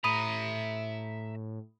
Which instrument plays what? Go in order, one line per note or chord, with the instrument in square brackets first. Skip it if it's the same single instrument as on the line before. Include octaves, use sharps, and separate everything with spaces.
[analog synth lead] A2 [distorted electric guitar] E5 A#5 [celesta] B5 D#6 D#7